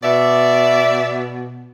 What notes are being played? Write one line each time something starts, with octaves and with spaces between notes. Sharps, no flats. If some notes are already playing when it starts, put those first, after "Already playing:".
B2 D5 E5